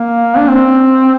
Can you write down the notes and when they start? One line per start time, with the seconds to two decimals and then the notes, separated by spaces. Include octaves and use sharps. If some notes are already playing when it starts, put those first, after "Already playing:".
Already playing: A#3
0.37 D4
0.48 C4